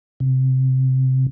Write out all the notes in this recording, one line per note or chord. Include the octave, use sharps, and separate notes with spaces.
C3